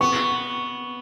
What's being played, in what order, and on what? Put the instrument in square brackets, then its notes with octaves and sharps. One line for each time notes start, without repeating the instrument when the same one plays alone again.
[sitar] B3 [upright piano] C#6